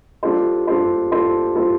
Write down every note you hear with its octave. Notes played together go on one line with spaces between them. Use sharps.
G3 D4 F4 A4 C5
G3 D4 F4 A4 C5
G3 D4 F4 A4 C5
G3 D4 F4 A4 C5